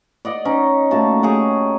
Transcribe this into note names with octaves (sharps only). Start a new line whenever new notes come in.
D5 D#5 F#5
C#4 D#4
A#2 A3 F#4 A5
G#4 C#5 F#5 G5